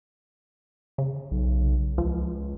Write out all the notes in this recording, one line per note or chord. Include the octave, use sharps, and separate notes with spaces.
C#3
B1
C#2 F3